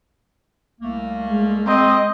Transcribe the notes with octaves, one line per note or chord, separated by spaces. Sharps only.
C2 A3 A#3
G#3
C4 D#5